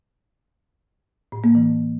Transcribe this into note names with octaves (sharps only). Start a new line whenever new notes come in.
A2
A#3
E3